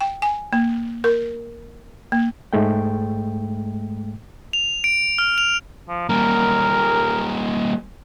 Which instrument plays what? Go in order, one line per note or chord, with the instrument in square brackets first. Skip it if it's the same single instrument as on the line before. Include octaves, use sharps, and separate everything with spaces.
[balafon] G5
G#5
A#3
A#4
A#3
[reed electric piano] G#2 G#3 A3 G5
[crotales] F7
D7
F6
F7
[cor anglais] F3
[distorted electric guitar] G3 A#3 [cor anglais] A#4